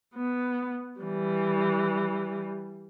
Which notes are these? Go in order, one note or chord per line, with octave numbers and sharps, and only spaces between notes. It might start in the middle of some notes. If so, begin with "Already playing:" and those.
B3
E3 G3